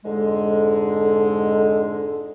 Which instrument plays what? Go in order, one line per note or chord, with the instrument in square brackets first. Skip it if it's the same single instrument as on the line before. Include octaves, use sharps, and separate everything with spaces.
[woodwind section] F2 G#2 D3 G#3